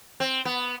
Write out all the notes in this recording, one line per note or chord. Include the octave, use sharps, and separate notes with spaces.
C4
B3